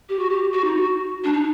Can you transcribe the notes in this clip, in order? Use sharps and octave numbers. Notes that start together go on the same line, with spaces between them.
G4
F#4
G4
F#4
D#4
F#4
D4
D#4